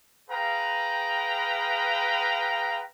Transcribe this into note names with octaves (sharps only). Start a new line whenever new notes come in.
G#4 B4 F5 G5 A#5